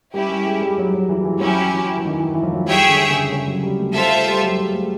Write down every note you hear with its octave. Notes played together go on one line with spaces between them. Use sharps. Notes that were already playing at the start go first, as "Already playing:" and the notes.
G3 C#4 E4 G4
G3
G#3
G3
F#3
F#3
E3
E3
F#3 C#4 E4 G4
E3
E3
D#3
E3
E3
F3
F#3
F#3
G3 G#4 C#5 E5 G5
D3
C#3
C#3
F#3
G3
A3
A3 F4 A4 C5 E5
G3
F#3
G#3
A3